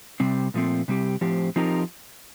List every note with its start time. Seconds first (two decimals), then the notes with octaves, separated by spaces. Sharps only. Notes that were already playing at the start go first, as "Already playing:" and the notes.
0.20 C3 G3 C4
0.54 A#2 F3 A3 C4
0.88 C3 G3 C4 G4
1.21 A2 F3 C4 G4
1.56 F3 C4 D#4 G4 A#4